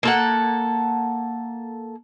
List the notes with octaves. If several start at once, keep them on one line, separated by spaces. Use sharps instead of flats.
A#3 A4 F#5